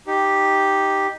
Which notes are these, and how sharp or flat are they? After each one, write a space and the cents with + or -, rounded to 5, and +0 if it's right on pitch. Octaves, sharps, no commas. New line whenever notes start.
D#4 +0 G4 +0